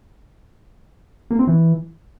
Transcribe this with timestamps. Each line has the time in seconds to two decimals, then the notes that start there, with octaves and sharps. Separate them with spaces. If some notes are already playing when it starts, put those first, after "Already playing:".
1.31 A#3
1.39 C4
1.47 E3